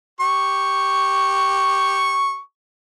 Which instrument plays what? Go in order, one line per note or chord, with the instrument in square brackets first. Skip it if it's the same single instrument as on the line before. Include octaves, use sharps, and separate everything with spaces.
[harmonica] G4 C#6